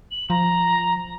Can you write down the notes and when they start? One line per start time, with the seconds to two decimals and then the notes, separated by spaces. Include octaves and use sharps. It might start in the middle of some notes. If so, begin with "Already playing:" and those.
0.11 F#7
0.30 F3 A#5